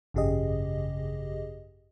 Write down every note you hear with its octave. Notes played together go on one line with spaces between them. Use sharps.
G#1 F#2 C#3 G4 G#4 D#5